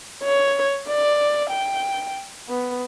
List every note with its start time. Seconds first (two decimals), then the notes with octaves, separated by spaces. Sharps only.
0.23 C#5
0.87 D5
1.49 G5
2.49 B3